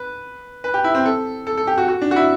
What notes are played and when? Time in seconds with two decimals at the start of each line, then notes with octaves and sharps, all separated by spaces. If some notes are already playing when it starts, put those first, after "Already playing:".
Already playing: B4
0.64 B4
0.74 G4
0.84 E4
0.95 C4
1.05 A4
1.47 A4
1.57 A4
1.67 G4
1.78 F#4
1.88 F#4
2.02 D4
2.11 F#4
2.16 E4